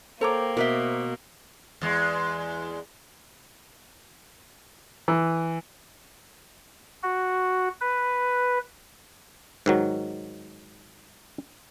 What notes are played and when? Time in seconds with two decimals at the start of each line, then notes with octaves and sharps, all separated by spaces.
0.21 A#3 A4 C5 C#5 G5 A#5 D6
0.57 B2 A#4 B4 E5 C6
1.81 E2 G#3
5.08 E3
7.03 F#4
7.81 B4
9.66 G#2 D#3 F#3